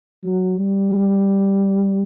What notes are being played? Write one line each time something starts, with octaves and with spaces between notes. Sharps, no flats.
F#3
G3
G3